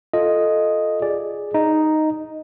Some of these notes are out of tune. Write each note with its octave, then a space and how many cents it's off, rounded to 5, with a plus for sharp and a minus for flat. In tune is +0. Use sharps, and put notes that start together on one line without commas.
F4 +0 A4 +0 D#5 +0
G#4 +0 D5 +0
D#4 +0 D#5 +0